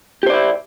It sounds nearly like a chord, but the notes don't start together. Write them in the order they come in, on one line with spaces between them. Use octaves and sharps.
G4 C5 D5 E4